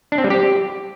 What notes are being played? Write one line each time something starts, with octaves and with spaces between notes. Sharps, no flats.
D4
C4
G3
G4